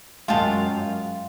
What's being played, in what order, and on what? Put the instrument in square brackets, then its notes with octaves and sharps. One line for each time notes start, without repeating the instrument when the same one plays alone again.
[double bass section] F#2 [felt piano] G#3 [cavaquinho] F4 G5 A5 [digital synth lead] F5